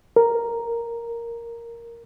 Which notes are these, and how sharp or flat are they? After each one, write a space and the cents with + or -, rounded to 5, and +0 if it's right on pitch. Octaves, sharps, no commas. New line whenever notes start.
A#4 +0